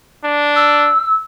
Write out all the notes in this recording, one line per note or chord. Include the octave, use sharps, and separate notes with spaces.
D4
E6